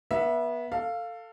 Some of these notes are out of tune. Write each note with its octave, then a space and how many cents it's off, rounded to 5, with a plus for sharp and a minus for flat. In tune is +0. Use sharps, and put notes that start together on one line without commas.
B3 -30 E5 +0
A4 +20 F5 +0